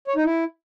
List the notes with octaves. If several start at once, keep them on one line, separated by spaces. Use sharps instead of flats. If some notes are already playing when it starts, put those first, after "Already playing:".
C#5
D#4
E4